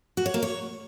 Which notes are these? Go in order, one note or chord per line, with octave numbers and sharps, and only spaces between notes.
F#4
C#5
A#3
C#5